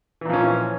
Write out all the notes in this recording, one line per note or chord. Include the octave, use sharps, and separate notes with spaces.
A#2 E3 F3 C#4